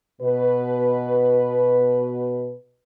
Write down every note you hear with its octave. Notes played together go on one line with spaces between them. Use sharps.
B2 B4